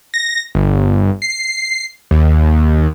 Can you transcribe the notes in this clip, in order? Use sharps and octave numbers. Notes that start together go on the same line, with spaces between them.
A#6
G1
C7
D#2